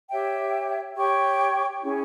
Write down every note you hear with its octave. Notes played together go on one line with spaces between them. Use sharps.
G4 C#5 E5 G5
G4 C#5 G5 C#6
C#4 E4 G#4